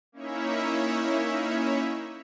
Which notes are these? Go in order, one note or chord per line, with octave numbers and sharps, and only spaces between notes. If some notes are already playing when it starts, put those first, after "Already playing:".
A#3 C#4 D#4 E4 C#5 E5